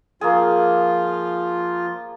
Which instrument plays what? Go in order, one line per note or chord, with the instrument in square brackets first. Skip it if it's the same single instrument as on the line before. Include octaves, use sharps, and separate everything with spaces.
[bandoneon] F3 F4 [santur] A#3 G#4